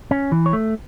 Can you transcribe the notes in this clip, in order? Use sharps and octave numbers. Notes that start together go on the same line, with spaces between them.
C#4
E3
C#5
A3